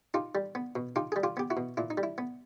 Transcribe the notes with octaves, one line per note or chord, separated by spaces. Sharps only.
D#4 F4 G4
G3
B3
B2
D#4 F4 G4
G3 G#4
F4 G4
B3 G4
E4 F#4
B2
A#2 E4
D#4
G3
E4
B3